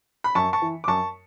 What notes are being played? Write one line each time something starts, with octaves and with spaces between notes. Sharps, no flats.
B5
F#2 A5 C#6
A5 C#6
E3
D6
F#2 A5 C#6